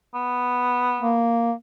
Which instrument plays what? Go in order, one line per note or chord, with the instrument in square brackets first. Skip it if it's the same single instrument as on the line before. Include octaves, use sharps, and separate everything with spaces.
[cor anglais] B3
[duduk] A#3